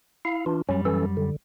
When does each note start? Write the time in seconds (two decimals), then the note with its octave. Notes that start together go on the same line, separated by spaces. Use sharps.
0.25 E4 F5
0.46 E3 D4 F4
0.69 F#2 F#3 G3 C#4
0.85 E3 C#4 A4
1.17 D3